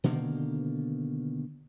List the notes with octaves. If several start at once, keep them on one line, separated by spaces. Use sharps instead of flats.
B2 D3 D#3 A#3